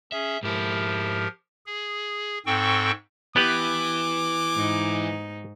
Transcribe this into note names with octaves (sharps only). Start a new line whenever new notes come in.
C#4 G#4 E5
G#2 F3 E4 G4 A#4
G#4
G#2 C4 A4 G5 C#6
E3 B3 G4 B4 D6
G#2 D#4